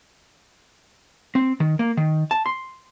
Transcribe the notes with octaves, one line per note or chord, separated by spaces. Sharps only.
C4
D#3
A#3
D#3
A5
C6